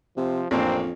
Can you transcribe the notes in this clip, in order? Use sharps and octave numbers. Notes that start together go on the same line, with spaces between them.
C3 F3
A1 F2 A#3 C4 D4